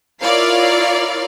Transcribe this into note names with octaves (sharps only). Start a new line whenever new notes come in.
E4 F4 A#4 C#5 D5 F5